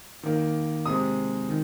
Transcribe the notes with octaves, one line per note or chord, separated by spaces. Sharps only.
D#3 A#3
C3 G#3 D#6
D#3